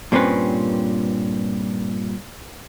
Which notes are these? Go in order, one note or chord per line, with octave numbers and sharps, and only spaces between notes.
G2 A#2 C4 C#4 B4